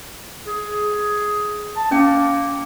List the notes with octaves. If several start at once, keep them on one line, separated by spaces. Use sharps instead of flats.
G#4
A5
A#3 C#4 G5